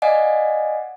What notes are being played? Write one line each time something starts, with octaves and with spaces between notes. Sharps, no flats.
D5 D#5 F5 F#5 G#5